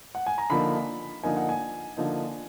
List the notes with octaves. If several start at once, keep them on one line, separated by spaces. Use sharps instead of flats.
F#5
G#5
A#5
D3 F3 A#3 D#4 B5
D3 F3 A#3 D#4 G#5
F#5
G#5
D3 F3 A#3 D#4